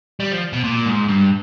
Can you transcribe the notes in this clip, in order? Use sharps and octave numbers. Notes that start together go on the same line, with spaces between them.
G3
F3
B2
A#2
G#2
G2